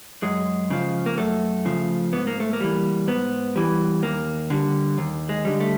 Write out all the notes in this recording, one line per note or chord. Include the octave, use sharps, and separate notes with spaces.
F#2 G#3
C#3 F3
A#3
F#2 A3
C#3 F3
G#2 B3
A#3
A3
A#3
E3 G3
G#2 B3
E3 G3
D#2 A#3
D3 G3
D#2
G#3
D3 G3
A3